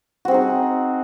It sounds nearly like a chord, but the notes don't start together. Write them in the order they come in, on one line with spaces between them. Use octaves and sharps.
F#4 C4 G#4 D#4